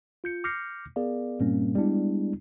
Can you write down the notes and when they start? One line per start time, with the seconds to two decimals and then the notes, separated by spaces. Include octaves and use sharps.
0.24 F4 G6 C#7
0.44 D6 F6 G6 A#6 C7 C#7
0.96 B3 G#4 A#4 D5 F5
1.39 G2 A#2 G3 A#3 C4 C#4
1.75 G3 G#3 B3 D4 E4